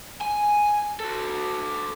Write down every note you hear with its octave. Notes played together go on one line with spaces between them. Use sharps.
G#5
F#4 A4